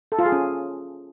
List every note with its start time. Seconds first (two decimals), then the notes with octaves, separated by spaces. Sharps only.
0.12 A4
0.19 F4
0.25 G#4
0.32 C#4